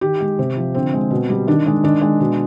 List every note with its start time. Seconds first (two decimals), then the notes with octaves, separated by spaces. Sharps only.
0.01 D#3 G4
0.20 G#3
0.39 C3
0.57 F3
0.75 D3 C4
0.93 G#3
1.11 B2
1.30 G3
1.47 D#3 D4
1.66 G#3
1.84 D#3 D4
2.02 G#3
2.20 B2